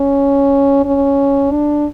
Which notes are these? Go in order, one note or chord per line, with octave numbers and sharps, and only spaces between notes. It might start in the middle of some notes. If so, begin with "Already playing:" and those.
Already playing: C#4
C#4
D4